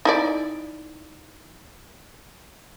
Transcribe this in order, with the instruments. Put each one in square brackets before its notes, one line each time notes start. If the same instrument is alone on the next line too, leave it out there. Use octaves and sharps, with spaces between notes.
[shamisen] D#4 E4 D5